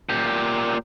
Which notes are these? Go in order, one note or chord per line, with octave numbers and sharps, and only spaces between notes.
A#2 G4